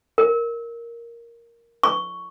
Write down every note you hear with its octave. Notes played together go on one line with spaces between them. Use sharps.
A#4
C#6